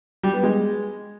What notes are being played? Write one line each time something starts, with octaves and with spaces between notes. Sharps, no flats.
G3
B3
G#3